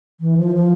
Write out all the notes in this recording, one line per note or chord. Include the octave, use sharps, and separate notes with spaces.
E3
F3
F3